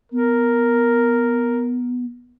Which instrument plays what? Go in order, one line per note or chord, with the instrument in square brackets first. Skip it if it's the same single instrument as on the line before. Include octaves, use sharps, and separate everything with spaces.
[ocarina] B3 [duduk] A#4